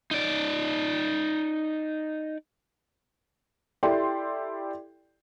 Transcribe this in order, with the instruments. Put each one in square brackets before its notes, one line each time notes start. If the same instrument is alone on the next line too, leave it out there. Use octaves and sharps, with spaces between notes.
[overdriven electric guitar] D#4 D5
[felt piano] E4 G4 A4 D5 G5 C6